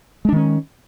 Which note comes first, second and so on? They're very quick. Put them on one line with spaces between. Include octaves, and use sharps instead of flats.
G#3 D4 D#3 C#4